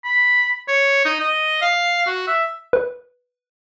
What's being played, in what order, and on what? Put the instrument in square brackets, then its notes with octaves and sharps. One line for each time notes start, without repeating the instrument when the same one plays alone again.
[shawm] B5
C#5
D#4
D#5
F5
F#4
E5
[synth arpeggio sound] B4